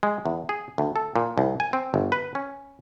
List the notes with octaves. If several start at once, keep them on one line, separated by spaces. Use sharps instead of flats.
G#3
E2
G#4
D2
A4
A#2
C2
G#5
C4
G1
B4
C#4